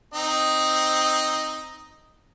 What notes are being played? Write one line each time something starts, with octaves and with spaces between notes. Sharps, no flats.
C4 D#4 D#5